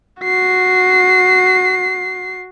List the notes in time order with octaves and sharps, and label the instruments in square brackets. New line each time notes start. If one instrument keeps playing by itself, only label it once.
[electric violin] F#4 C7